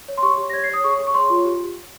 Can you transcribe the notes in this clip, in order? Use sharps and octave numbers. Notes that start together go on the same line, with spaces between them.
C#5
C6
G4 C#6
G4
A#6
C#5 G#6
C7
C#5 D#6
G#4 C#6
G#4
C#6
C#5 C6
F4
G4